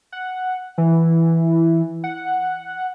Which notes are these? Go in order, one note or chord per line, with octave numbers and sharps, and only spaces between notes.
F#5
E3
F#5